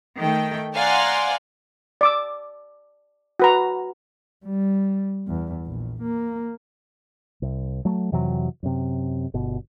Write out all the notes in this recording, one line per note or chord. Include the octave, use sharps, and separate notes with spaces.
D#3 A3 G5
D5 F5 F#5 G#5 A#5 C6
D5 D6 E6
F#4 B4 A#5
G3
E2
A#1
A#3
C2
F#3 A3
F2 C3 E3 F#3
F#2 C3
G1 B2